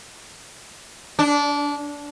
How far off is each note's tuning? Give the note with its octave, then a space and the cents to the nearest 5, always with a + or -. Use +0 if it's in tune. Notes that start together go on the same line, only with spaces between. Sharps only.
D4 -20